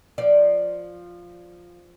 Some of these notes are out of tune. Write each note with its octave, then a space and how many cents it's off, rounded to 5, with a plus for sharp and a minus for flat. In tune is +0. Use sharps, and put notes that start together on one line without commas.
F3 +0 D5 +0